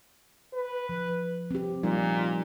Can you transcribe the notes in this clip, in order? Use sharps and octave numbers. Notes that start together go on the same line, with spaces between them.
B4
F3
C4 G4
A#2 F3 G3 D#4